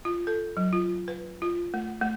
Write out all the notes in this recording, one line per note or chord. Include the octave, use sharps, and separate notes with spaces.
F4
A4
F#3
F4
B4
F4
A3
A3